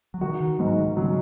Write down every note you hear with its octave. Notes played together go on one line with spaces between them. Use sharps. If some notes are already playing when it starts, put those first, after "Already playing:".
F#3
D#3 F#4
D#3
G#2 F#3
D#3
C#3 F#3